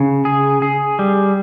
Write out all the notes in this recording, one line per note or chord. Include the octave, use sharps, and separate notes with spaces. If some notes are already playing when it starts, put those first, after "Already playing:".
Already playing: C#3
G#4
G#4
G3